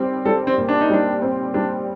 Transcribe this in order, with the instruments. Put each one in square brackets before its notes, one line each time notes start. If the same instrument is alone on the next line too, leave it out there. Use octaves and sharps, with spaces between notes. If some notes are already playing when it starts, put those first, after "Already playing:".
Already playing: [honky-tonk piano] G3 C4
[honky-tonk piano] G3 [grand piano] A4
[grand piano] C4
[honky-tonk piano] A#2
[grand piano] D4
D#4
[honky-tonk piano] G3 [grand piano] D4
[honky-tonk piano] C4
[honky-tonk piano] G3 [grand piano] D4